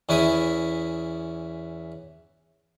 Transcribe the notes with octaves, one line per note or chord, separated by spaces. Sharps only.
E2 C#4 E4 E5 D#6